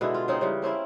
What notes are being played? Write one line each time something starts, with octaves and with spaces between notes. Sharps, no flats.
B2 D3 G#3 E4
F4
C#3 C4 D#4
C#3 E3 G3
A#3 C4 C#4 E4